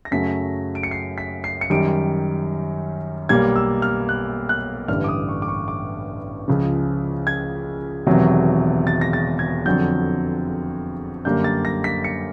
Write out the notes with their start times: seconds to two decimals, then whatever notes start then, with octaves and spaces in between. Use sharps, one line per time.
0.05 A#6
0.11 F#2 C#3 F#3 A3 B6
0.75 D7
0.83 C#7
0.91 C7
1.18 B6
1.44 C7
1.61 C#7
1.70 F#2 D#3 G3 D7
3.29 B1 B2 G3 A#3 G#6
3.56 E6
3.82 F6
4.09 F#6
4.49 F#6
4.88 A1 G2 D3 F6
5.04 D6
5.09 D#6
5.29 C#6
5.42 D6
5.48 C#6
5.68 D6
6.48 C#2 C#3 F3
7.27 G#6
8.07 E1 E2 C3 D#3 F#3
8.87 A6
9.01 A#6
9.13 A6
9.39 G#6
9.66 F2 D3 F#3 G6
11.25 F#2 D3 G3 A#3 G6
11.44 A6
11.65 A#6
11.84 B6
12.04 C#7